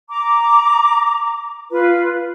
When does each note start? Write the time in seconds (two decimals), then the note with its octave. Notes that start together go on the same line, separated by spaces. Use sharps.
0.09 A#5 D6
1.70 F4 B4